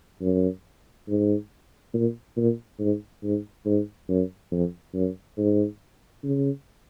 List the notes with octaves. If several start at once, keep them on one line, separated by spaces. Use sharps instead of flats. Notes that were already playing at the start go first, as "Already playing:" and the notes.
F#2
G#2
A#2
A#2
G#2
G#2
G#2
F#2
F2
F#2
G#2
C#3